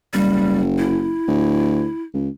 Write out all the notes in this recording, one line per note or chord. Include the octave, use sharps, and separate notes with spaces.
F#1 G3
E4
D2
C#2